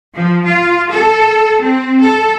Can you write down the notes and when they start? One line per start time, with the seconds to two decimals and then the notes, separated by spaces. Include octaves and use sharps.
0.14 F3
0.44 F4
0.90 A4
1.61 C4
2.00 A4